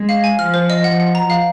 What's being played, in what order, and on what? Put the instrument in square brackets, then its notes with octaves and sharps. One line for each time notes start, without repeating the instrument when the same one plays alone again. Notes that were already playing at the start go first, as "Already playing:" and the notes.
Already playing: [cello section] G#3
[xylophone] F5
G#5
[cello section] F3 [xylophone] F6
[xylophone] C5
D#5
[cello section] F3 [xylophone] F#5
[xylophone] F#5
A#5
F5